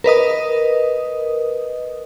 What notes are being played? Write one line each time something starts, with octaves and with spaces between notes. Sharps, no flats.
A#4 B4 D#5 D#6